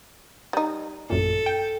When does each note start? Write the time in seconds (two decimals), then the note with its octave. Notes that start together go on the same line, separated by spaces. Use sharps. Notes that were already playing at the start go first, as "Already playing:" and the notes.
0.53 G3 D#4
1.10 A1 F#2 A#2 A4
1.46 G5